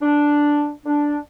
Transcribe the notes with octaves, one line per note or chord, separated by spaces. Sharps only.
D4
D4